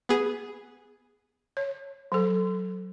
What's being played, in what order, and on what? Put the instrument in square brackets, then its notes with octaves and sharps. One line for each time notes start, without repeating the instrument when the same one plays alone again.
[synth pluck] B3 G#4
[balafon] C#5
F#3 A4